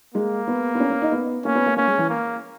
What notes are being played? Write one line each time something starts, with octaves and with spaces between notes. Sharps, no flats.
G#3 A#3
B3
B3
C#4
C#4
D#4
B3
A#3 C#4
B3
A#3
A#3 C#4
G#3
E3
A#3